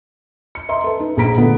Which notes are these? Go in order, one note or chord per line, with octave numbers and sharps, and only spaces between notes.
C#7
D#5 E5 A#5 C6
A4 B4
D#4 B4
A#1 G#4 A#5 B6 D7
A#2 D3 A3 B3